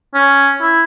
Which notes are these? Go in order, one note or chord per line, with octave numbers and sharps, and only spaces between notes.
C#4
E4